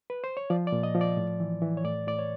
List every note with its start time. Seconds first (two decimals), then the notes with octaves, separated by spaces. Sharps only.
0.10 B4
0.24 C5
0.37 C#5
0.50 F3 D5
0.67 D5
0.72 A#2
0.83 D#5
0.95 F3
1.01 D5
1.17 A2
1.40 E3
1.62 E3
1.77 C#5
1.84 A2 D5
2.07 A2 D5
2.19 C#5